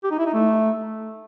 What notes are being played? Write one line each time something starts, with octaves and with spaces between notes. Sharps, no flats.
G4
D#4
E4
D#4
A3